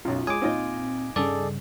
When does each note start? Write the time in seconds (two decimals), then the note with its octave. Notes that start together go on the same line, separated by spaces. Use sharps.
0.05 B1 F#2 F4
0.27 G#3 G#5 D6 D#6
0.42 A#2 C4 D#4 F4 D#5
1.16 G2 C#3 G#4 A4 D5